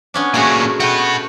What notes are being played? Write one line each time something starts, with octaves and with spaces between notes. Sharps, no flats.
B3 C#4 D4
A#2 A3 C#4 F#4 G#4
A3 F#4 B4 G5